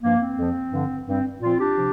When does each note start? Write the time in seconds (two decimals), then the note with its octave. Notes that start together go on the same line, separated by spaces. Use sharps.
0.02 G2 F3 A#3
0.19 C4
0.37 F2 F3
0.72 G2 D3 F3
1.06 G2 G3 C4
1.41 A#2 F3 C4 F4
1.58 D4 G4
1.76 C3 F3